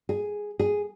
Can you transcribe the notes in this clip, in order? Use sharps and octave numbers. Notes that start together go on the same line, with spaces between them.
G#4
G#4